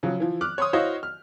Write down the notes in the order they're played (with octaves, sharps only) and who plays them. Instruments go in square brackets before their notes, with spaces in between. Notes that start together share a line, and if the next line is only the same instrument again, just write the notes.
[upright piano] C#3 F3 F#3
E3 F3
D6 F6 F#6
C#5 C6 D#6
E4 F#4 C5 C#5 D#5 F5
F6